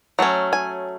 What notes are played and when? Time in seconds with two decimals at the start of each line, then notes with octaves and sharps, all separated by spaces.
0.19 F#3 A3 C#4
0.53 G#5